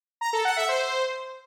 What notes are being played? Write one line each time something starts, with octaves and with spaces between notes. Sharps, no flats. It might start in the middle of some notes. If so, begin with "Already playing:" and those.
A#5
A4
F#5
E5
C5